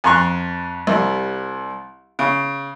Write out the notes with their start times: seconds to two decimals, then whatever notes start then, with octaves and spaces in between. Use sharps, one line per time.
0.04 F2 A#5 C6 C#6 F#6
0.87 C2 G3
2.19 C#3